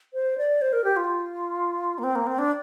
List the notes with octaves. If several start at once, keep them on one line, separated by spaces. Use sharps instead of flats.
C5
D5
C5
A#4
G4
F4
A#3
C4
A#3
C4
D4